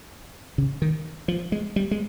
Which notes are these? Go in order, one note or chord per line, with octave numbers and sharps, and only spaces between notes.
C#3
D#3
F3
G#3
G3
G#3